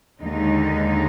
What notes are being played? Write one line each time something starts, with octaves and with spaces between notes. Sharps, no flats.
D#2 D3 G#3 D#4